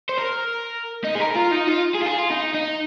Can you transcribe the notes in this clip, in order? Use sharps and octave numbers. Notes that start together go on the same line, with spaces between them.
C5
A#4
D#4
G#4
A#4
F4
D#4
F4
G#4
F4
G#4
F4
D#4
D#4